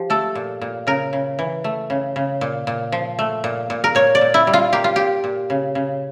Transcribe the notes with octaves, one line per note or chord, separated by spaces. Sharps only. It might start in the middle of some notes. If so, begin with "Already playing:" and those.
Already playing: F3 G4
A3 A4
A#2
A#2
C#3 A#4
C#3
E3
A3
C#3
C#3
A#2
A#2
F3
A3
A#2
A#2
A#4
A#2 C#5
D5
A#2
E4
G3
F4
A#3 G4
F4
A#2 G4
A#2
C#3
C#3